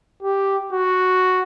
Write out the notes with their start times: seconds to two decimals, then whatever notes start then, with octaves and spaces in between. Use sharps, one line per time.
0.23 G4
0.73 F#4